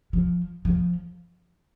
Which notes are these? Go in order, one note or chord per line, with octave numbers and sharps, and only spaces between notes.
F3
F3